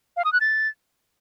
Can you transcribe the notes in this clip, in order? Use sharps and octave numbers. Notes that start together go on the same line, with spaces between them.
F5
D#6
F#6
A6